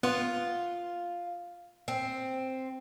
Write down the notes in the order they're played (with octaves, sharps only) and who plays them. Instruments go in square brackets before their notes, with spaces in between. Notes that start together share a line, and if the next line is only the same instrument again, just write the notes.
[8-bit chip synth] B3 [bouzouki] F4
[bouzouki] C4